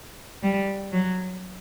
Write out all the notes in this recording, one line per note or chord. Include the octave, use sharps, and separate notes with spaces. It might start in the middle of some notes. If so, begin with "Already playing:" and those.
G3
F#3